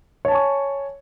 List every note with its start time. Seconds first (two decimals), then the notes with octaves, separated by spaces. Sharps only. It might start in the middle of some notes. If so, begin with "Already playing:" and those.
0.25 C#5
0.28 A5
0.32 G#5
0.35 C#6